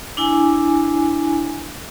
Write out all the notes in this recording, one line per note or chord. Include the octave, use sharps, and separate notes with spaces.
D4 E4 G#5